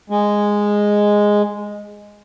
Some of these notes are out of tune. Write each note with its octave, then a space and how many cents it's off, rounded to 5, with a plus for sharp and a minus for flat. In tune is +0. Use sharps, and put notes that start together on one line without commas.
G#3 -5